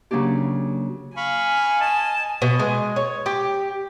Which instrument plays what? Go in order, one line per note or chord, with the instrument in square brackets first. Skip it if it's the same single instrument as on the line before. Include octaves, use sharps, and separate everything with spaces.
[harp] C#3 F#3 A#3 D4 G4
[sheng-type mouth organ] F5 B5 C#6 [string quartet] G#5
[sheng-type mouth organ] D#5 [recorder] A5
[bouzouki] B2
G#3
C#5
G4